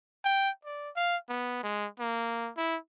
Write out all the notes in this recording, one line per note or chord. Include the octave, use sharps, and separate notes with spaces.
G5
D5
F5
B3
G#3
A#3
E4